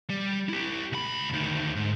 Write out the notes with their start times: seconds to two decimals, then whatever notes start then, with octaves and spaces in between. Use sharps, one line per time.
0.10 G3
0.49 E4 G4
0.92 C#2 B5
1.33 D2 D#3
1.76 G#2